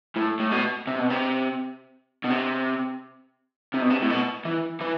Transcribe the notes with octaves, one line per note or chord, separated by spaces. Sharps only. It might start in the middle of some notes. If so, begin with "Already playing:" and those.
A2
A2
B2
C3
B2
C3
B2
C3
C3
B2
C3
A2
B2
E3
E3